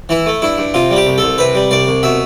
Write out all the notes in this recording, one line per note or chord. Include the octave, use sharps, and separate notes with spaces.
E3 E4
A3
G2 E4
G2
C3 F4
G3
G4
C2
C2 A4
C3 B4
G3
C2 D5
C2
B2 E5